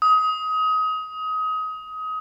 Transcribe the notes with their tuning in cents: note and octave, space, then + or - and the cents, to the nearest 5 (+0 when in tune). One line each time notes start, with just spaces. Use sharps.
D#6 +25